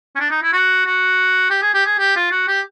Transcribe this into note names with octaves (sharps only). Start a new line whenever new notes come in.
C#4
D4
D#4
E4
F#4
F#4
G4
G#4
G4
G#4
G4
F4
F#4
G4